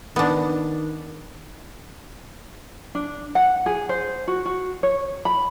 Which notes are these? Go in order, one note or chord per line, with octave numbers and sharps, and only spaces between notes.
D#3 B3 D4
D4
F#5
G#4
C5
F#4
F#4
C#5
B5